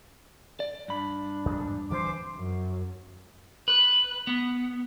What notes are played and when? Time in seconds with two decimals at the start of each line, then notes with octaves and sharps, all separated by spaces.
0.60 D5
0.88 G2 D4 B5
1.45 E2 G#2
1.90 D1 E3 C4 C5 D6
2.37 F#2
3.68 B4
4.27 B3